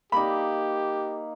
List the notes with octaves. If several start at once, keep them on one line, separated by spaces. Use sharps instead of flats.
A#3 D#4 G4 B5